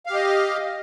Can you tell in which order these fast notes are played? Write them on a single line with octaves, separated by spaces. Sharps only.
F5 G4 D#5